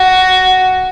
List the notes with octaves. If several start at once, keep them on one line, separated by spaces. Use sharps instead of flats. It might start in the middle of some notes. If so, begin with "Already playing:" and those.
Already playing: F#4